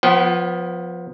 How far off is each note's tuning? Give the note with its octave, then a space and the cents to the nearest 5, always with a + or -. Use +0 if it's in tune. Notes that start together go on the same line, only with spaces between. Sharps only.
F3 +15 B3 +0 F#5 +45